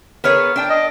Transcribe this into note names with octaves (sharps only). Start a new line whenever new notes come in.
B3 G#4 A#4 C#5 F6
D4 G5
D#5